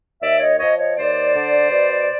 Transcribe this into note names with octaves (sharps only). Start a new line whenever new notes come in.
D#2 D5 E5
C#5 D#5
F3 C#5 D#5
C#5 D#5
D#2 C5 D5
D3
B2